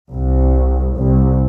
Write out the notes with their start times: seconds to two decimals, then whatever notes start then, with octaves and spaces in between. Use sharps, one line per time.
0.11 C2
0.96 C2